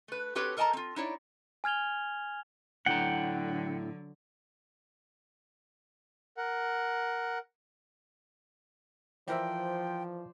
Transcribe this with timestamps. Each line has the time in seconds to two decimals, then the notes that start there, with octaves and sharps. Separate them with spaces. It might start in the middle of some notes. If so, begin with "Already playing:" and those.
0.08 A3 B4
0.35 C4 F#4 G4 A4 B4 C#5
0.57 A4 A#4 D#5 G5 A5 A#5
0.73 C4 F4
0.96 D#4 E4 C#5 D5
1.64 G#5 F6 G#6 F7 G7
2.86 A2 D3 F#3 E4 F#5 G5 A#5
6.37 A#4 F#5
9.28 E3 F3 A#4 C5 D5 E5 G5